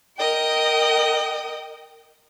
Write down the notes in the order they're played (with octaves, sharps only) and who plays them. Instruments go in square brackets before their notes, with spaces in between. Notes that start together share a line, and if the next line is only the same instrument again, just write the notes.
[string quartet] A#4 D#5 G5